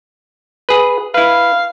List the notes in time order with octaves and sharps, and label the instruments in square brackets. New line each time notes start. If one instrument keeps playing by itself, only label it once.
[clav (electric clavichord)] G#4 B4
[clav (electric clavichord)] E4 B4 [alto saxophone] F5